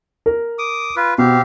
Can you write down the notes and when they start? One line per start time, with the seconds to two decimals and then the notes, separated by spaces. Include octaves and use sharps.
0.26 A#4
0.59 D6 D#6
0.96 F4 B4
1.18 B2 C4 G4 F5